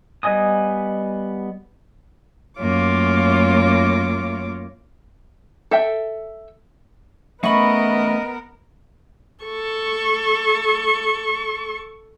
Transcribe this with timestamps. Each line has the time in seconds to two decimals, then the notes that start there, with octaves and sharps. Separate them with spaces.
0.23 G3 B3 D#5 G#5 D#6
2.59 F#2 A3 A#3 F4 C#5 D6
5.71 A4 E5 G5
7.43 A3 B3 C#4 A#4 D#5 E5 B5 C#6
9.44 A4 C#6